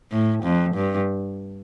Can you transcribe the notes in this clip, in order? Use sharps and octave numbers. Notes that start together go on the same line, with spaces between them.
A2
F2
G2